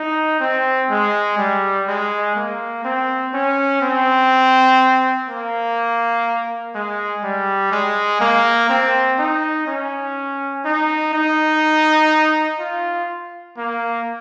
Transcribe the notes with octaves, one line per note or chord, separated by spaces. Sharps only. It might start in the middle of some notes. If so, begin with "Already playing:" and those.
Already playing: D#4
C4
G#3
G3
G#3
A#3
C4
C#4
C4
A#3
G#3
G3
G#3
A#3
C4
D#4
C#4
D#4
D#4
F4
A#3